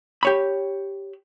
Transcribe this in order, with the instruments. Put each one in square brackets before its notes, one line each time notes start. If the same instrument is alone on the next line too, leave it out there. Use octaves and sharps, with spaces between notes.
[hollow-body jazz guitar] G4 C#5 B5